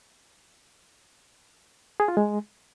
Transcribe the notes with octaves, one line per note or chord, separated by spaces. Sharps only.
G#4
F4
G#3